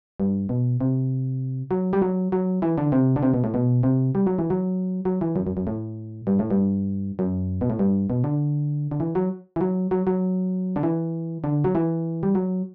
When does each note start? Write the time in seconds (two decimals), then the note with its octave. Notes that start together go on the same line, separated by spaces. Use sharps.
0.20 G2
0.49 B2
0.81 C3
1.71 F#3
1.93 G3
2.02 F#3
2.32 F#3
2.62 E3
2.78 D3
2.92 C3
3.16 D3
3.23 C3
3.34 B2
3.44 A2
3.54 B2
3.83 C3
4.15 G3
4.27 F#3
4.39 E3
4.50 F#3
5.05 F#3
5.21 E3
5.36 F#2
5.47 F#2
5.57 F#2
5.67 A2
6.27 G2
6.39 A2
6.51 G2
7.19 F#2
7.61 B2
7.70 A2
7.79 G2
8.10 B2
8.24 D3
8.91 D3
9.00 E3
9.15 F#3
9.56 E3
9.61 F#3
9.91 F#3
10.07 F#3
10.76 D3
10.83 E3
11.44 D3
11.64 F#3
11.75 E3
12.23 G3
12.35 F#3